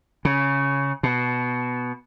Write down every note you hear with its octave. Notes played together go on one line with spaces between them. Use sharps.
C#3
B2